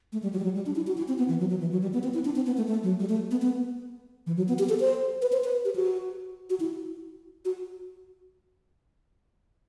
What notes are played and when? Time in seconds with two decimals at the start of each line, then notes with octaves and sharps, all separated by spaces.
0.13 A3
0.23 G3
0.33 F#3
0.39 G3
0.44 F#3
0.55 G3
0.66 D4
0.76 E4
0.87 F#4
0.97 E4
1.08 C4
1.18 B3
1.29 E3
1.40 F#3
1.50 F#3
1.61 E3
1.72 F#3
1.82 G3
1.93 B3
2.03 C4
2.14 E4
2.25 D4
2.36 C4
2.46 B3
2.57 A3
2.67 A3
2.83 F#3
3.00 G3
3.09 A3
3.31 B3
3.42 B3
4.27 E3
4.37 F#3
4.48 B3
4.59 G4
4.69 A4
4.80 C5
5.22 B4
5.32 C5
5.44 B4
5.65 G4
5.76 F#4
6.50 F#4
6.60 E4
7.45 F#4